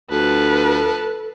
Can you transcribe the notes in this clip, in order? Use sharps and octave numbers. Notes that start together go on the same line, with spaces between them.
D2 F3 A4 B4 A5